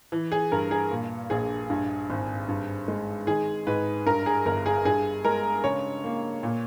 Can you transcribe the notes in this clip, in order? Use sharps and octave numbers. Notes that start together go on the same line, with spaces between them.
E3
G#4
G2 A#4
G#4
A#2
A#1 G#4
G2
G#1
G2
G#3
D#3 G#4
G#2 B4
G2 A#4
G#4
G1 A#4
G#4
G2 G#4
G#3 A#4
C#3 C#5
A#3
A#2